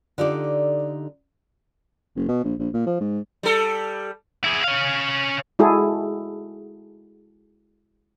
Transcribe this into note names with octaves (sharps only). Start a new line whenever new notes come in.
D3 D#4 F4 G4 A4 D5
F#1
B2
A#1
A#1
A#2
F3
G#2
G3 A4
E4 G#4
C#4 F5
G#3 E4 F#4 G#4 A4